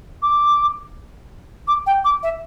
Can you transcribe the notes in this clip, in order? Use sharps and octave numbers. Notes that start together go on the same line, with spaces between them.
D6
D6
G5
D6
E5